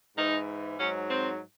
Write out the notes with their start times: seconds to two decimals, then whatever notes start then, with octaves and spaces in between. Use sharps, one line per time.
0.16 G#2 E3 D#4
0.78 G#2 F#3 C#4
1.08 C4